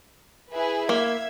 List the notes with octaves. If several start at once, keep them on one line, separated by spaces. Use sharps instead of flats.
E4 G#4 B4
A#3 E5 G#6